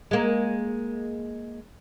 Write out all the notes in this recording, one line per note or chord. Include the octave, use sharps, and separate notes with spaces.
G#3 A#3